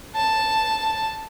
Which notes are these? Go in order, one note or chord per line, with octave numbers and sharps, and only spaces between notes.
A5